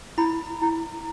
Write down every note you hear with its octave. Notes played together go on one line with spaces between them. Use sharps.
E4 B5
E4